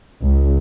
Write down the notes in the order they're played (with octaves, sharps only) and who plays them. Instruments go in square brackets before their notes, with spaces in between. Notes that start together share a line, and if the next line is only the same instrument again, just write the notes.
[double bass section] C#2